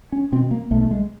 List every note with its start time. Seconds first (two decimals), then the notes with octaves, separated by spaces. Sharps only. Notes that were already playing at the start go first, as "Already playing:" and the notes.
0.12 C#4
0.32 B2 C4
0.51 A#3
0.71 B1 A3
0.81 A3
0.91 G#3